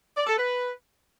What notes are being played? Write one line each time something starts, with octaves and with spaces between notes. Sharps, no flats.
D5
A4
B4